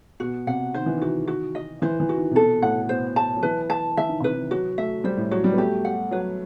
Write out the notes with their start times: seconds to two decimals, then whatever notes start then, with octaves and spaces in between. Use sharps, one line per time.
0.20 B2 F#4
0.47 C3 F#5
0.74 D#3 C5
0.86 E3
0.98 D#3 F#4
1.28 F#4
1.55 D#5
1.82 E3 C5
2.00 E3
2.09 F#4
2.18 D#3
2.31 C3
2.35 B2 A4
2.62 A2 F#5
2.89 B2 C5
3.16 A5
3.36 F#3
3.43 E3 B4
3.70 A5
3.97 E3 E5
4.09 D#3
4.21 C3 B4
4.34 D#3
4.50 F#3 F#4
4.78 A3 E5
5.04 G3 C5
5.17 A2
5.31 F#3 F#4
5.44 G3
5.52 B3
5.58 A3 G4
5.85 F#5
6.11 F#3 B4